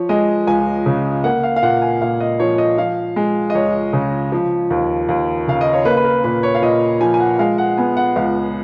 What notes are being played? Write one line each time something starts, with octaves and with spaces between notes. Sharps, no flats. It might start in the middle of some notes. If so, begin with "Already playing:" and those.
Already playing: F3 C#5
G#3 D#5
C#2 G#5
C#3
A#3 F#5
F5
F5
A#2 F#5
G#5
A#2 F5
D#5
F3 C#5
D#5
F3 F5
G#3
D#5
C#2 C#5
C#3
F3
D#2
D#2
C#3 F5
D#5
C#5
A#3 B4
B4
A#4
A#2 B4
C#5
F5
A#2 D#5
F3 G#5
G#5
F#5
G#3 F5
F#5
B3 G#5
F#5
C#2 F5